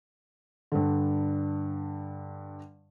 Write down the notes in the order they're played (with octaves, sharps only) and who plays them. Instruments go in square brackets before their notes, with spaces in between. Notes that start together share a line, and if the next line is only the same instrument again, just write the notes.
[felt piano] G2 D3